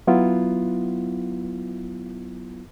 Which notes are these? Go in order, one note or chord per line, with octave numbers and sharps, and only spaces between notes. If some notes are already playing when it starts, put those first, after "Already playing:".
F#3 B3 E4 F4